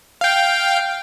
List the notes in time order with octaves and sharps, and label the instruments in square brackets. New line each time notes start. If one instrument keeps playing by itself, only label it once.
[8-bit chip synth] F5 G5